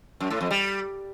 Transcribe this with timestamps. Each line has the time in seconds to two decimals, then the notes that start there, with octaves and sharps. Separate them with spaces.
0.20 F#2
0.31 A2
0.41 F2
0.51 G3